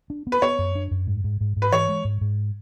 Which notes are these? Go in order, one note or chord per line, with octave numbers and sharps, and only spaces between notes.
D4
B3
B4
B3 C#5
F#2
D4
F#2
G#2
G#2
G#2
G#2
B4
E3 C#5
G#3
G#2
G#2